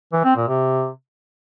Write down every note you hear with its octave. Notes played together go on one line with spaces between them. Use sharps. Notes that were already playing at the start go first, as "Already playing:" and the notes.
E3
C4
A#2
C3